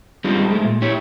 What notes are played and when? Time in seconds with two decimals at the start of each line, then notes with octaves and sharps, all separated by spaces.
0.24 G3 G#3 C4 D4 D#4 F4
0.51 G#3 A3
0.64 A#2
0.82 E4 G4 C#5